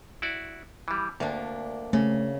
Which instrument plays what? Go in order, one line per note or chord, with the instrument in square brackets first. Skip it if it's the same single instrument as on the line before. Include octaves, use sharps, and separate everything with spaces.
[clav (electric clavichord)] E4 F#4 D5
E3 G3
[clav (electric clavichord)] D2 [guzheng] A#3 D4
[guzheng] C#3 [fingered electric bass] A3